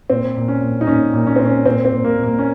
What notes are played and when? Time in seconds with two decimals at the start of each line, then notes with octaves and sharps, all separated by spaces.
0.10 A#2 C4
0.36 A#2
0.48 C#4
0.61 A#2
0.81 D#4
0.87 A#2 C#4
1.13 A#2
1.27 C#4
1.36 A#2 C4
1.45 C#4
1.66 A#2 C4
1.85 C4
1.92 A#2
2.04 A#3
2.17 A#2
2.23 A#3
2.39 C#4